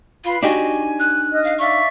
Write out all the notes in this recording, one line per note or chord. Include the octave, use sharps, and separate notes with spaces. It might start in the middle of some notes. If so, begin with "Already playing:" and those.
F4 B4 F5 B5
D4 D#4 F#4 G4 G#5
F#6
D#5 F6
F5
D5 E5 F5 C#6